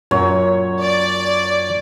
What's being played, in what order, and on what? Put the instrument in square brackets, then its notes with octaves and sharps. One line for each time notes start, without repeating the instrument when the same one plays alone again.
[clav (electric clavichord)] F#2 A#2 [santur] C#5
[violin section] D5